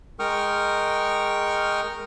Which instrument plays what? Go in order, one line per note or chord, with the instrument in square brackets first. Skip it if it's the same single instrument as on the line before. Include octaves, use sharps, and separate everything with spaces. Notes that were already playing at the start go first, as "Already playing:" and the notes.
[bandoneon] G#3 A#4 G5 C#6 D#6 F6